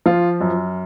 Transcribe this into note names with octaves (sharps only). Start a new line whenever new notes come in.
F3 F4
F#2